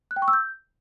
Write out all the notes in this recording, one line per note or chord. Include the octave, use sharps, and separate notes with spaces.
F#6
G5
C#6
E6
G6